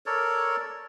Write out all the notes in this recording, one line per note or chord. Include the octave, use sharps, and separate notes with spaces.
A4 A#4 C#5 D5